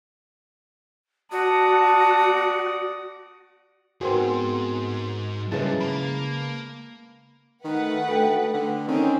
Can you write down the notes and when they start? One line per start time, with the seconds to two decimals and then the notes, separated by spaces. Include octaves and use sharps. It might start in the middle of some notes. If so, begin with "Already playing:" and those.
1.32 F#4 D5 A5 D#6
4.01 G#2 B3 C4 F#4 G#4 A#4 C6
5.52 G2 C#3 G#3 E4 B4 A5
5.80 A#3 B5
7.64 D#3 A3 B4 F#5
8.09 D2 A4 G5
8.54 D3
8.88 D#3 C4 C#4